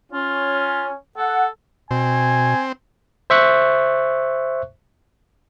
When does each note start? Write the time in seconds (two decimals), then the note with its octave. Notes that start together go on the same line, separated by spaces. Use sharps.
0.12 C#4 F4
1.17 A4 F#5
1.91 B2 C4 G#5
3.30 C5 E5 C#6 F#6